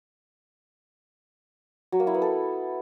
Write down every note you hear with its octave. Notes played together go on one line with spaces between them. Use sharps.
F#3
A#3
E4
B3
A4